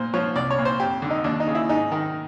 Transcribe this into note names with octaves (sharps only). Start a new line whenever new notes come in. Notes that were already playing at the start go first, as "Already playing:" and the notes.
Already playing: A#2 C5
F3 C#5
C2 D5
C#5
A#2
C5
F2 G4
D3
D#4
D#2 D4
D#4
C#3
E4
G#2 D#4
D#3